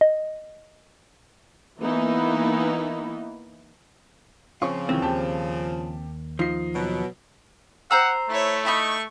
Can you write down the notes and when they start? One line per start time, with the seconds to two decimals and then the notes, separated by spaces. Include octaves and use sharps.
0.01 D#5
1.80 E3 A#3 B3 D#4 E4
4.62 C#3 F3 C4 C#4 F4 C#6
4.89 C2 D#3 E3 C4
5.02 D#2 G4 G5 A5
6.39 F3 D#4 C7
6.75 B2 F#3
7.91 C5 F#5 A#5 E6
8.29 A3 E4 C#5
8.66 D#4 B5 C#6